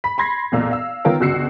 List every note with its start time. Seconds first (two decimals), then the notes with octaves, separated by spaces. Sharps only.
0.04 B5 B6
0.18 B5 C6 G#6 A#6 C7
0.52 B1 E2 A#2 F5 E6
0.71 F5 E6
1.05 D#3 B3 F4 A#4 C#5
1.20 G1 C#2 F#4 E6 C7 C#7